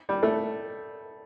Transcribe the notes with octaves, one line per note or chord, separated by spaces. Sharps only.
G3
A3